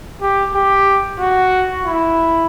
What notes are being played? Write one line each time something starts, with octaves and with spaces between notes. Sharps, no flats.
G4
G4
F#4
E4